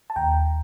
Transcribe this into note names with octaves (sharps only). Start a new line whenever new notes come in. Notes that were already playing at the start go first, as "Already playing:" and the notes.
A5
D#2 G5 A#5